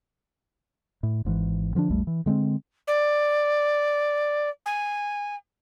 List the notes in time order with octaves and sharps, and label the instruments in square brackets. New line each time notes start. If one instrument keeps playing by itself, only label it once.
[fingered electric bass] A2
G#1 G#2 B2 E3
D3 F3 C#4 D4
A#1 E2 G3 A3
E3
D3 G#3 A3 C4
[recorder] D5
G#5